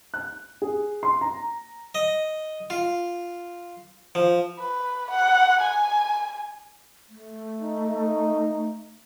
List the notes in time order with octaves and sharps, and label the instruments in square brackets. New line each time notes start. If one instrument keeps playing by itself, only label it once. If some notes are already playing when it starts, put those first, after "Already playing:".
[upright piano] F#6
G#4
C6
A#5
[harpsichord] D#5
F4
F3
[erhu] B4
F#5
G#5
[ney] A3
[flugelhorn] D#4